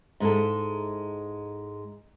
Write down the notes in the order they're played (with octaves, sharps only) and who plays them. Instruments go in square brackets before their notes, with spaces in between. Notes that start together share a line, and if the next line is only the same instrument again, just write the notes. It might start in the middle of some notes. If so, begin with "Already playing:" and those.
[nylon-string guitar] G#2 G#3 E4 A4